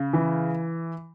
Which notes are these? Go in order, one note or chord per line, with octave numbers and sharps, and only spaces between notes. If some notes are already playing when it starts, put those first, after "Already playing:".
Already playing: C#3
E3